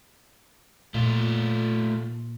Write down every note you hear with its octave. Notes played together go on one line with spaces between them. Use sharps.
A#2 A3 F4